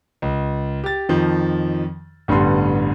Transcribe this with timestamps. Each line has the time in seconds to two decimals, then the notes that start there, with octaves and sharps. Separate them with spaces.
0.22 C#2
0.84 G4 A6
1.09 F2 D#3 F3
2.28 A1 G2 D3 G3 B3 C6